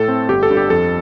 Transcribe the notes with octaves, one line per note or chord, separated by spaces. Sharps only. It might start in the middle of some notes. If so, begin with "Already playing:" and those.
Already playing: A2 A4
A3 C4
G1 G4
A4
G2 G3 D4
G4
F2 A4